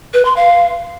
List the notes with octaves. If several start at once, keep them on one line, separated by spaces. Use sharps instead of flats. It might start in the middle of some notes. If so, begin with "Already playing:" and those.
B4
C6
F5